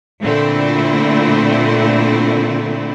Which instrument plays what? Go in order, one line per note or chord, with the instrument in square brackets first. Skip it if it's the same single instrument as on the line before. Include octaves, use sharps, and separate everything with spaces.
[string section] A#2 D3 A3 C4 E4